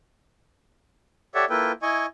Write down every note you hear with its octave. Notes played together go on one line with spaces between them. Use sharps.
G4 A4 C#5 D5 E5 F#5
A#3 E4 F4 A4 B4 G5
E4 D#5 G#5 C#6